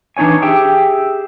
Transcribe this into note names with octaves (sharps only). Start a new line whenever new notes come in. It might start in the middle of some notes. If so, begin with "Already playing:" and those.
E3 D4 D#4 C#5 G#5
G4 G#4 E5 G5